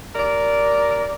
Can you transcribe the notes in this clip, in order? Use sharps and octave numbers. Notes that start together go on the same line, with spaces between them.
D#2 A#4 D5